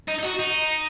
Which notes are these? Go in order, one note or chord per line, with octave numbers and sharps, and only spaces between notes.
D#4
D#4
F#4
D#4